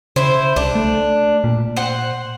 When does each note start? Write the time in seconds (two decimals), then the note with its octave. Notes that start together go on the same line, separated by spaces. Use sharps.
0.16 C#3 E4 C5
0.56 C2 D4
0.75 A3
1.44 A#2
1.76 C5 F#5